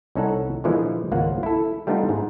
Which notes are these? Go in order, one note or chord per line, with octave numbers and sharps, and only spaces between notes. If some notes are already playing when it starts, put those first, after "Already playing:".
C2 C#4 D#4 A4 F#5
A#2 D3 E3 F3 G#3
G#1 C#2 A#3 F4 C5 F#5
E4 A4
G3 A3 B3 D4 D#4 F4
G#2